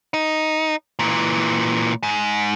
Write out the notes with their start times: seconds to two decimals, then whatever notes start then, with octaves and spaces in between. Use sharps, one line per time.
0.14 D#4
0.99 A#2 E3
2.03 G#2